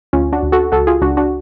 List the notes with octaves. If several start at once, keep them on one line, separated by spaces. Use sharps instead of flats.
D2 C#4 F4
D4 F#4
D2
F#4 A4
C#2 F#4 A4
F4 G#4
C#2 D4 F#4
D4 F#4